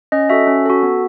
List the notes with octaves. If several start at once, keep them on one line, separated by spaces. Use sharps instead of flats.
C#4 D#5
F#4 A4 E5
C#4
F#4 A4
B3